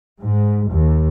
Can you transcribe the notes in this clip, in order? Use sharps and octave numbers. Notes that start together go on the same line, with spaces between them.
G#2
D#2